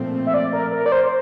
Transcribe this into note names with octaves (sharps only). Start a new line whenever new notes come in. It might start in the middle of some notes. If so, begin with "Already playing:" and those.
Already playing: A#2 F3 A3 C4
E5
D5
A#4
A#4
D5
C5